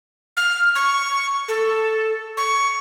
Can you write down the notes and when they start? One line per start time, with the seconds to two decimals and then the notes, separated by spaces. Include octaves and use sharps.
0.37 F6
0.75 C#6
1.48 A4
2.37 C#6